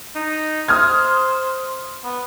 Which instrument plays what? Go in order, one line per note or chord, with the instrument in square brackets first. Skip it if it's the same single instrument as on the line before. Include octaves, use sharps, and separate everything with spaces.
[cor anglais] D#4
[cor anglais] C5 [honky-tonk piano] D#6 F6 G#6
[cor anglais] B3